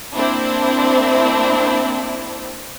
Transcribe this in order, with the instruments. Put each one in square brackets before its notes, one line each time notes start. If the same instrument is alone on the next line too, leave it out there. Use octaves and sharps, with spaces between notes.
[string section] A#3 C4 D4 E4